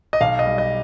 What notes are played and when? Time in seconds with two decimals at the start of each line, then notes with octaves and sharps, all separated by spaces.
0.13 D#5
0.21 B1 F5
0.39 D#5
0.46 G3
0.58 D#5